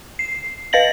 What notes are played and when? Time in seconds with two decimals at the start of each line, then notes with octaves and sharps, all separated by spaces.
0.19 C7
0.73 B4 D#5 F5 A6 A#6 F#7